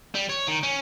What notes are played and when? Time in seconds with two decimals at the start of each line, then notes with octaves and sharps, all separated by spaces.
0.15 G3
0.30 C#5
0.48 D#3
0.63 C#4